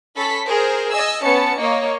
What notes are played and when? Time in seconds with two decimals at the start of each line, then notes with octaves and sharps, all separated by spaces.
0.17 C#4 A4 B5 B6
0.45 G#4 A#4 C5
0.91 D#5 G#5 E6
1.23 B3 C#4 A5 C#7
1.58 A#3 C#5 D#5